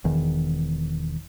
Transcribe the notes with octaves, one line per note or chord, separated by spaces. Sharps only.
E1 E2 D#3